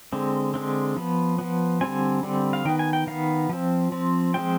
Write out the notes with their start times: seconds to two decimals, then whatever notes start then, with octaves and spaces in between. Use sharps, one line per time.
0.13 D3 G#3 C4
0.54 D3 G#3 C4
0.97 F3 B3
1.39 F3 B3
1.81 D3 G3 C4 G#5
2.23 D3 G3 C4
2.53 F5
2.65 D#3 B3 G5
2.79 G#5
2.93 G5
3.07 D#3 B3 F5
3.49 F3 C4
3.92 F3 C4
4.34 F3 G#3 C4 G5